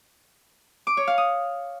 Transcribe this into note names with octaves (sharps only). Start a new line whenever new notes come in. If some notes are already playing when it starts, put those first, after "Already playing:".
D6
C#5
F5
D#6